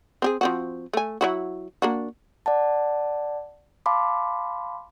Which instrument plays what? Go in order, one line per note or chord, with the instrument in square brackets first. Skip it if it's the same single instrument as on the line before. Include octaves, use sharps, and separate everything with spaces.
[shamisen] C4 G4 G#4
F3 C4 F#4
A3 G#5
F#3 E4 F#4
A#3 D4 F#4
[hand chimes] D5 F#5 A5
F5 A5 B5 C6 D6